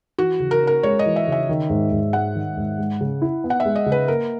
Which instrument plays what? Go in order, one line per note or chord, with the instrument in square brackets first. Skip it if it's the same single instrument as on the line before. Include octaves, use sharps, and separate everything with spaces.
[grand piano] E3 [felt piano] F#4
[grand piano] C#3
[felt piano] A#4
[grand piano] C#4
[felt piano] A#4
[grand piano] G#3 [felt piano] C#5
[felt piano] D#5
[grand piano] E3
[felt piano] E5
[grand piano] C#3 [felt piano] E5
[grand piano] D#3
G#2
G#2
[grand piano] G#3 [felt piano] F#5
[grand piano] D#3
G#2
G#3
C#3
E4
B3
[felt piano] F#5
E5
[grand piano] G#3
[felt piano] D#5
[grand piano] C#3
[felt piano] B4
[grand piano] A#3 [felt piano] A#4